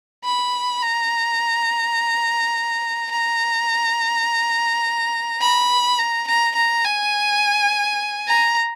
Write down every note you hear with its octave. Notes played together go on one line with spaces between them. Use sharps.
B5
A#5
A#5
B5
A#5
A#5
A#5
G#5
A#5